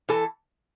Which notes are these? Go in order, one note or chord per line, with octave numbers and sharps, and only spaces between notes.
E3 A4